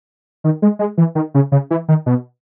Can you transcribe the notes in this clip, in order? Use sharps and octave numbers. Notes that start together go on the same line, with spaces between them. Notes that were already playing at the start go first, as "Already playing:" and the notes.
D#3
G#3
G#3
E3
D#3
C#3
C#3
E3
D#3
B2